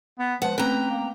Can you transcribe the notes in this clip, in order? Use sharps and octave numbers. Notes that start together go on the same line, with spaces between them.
B3
F3 G#3 B4 F#5
A3 C4 C#4 B4 G5 A#5
A#3